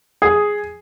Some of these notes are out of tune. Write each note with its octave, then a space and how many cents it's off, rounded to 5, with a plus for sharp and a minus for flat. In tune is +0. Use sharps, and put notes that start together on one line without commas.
G#4 +0